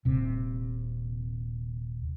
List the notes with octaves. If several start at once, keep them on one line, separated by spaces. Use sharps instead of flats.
D#1 C3